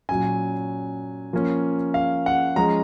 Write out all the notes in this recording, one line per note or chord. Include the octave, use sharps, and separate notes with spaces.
A#2 F#3 C#4 G#5
F3 A#3 C#4
F5
F#5
F3 G#3 C#4 A#5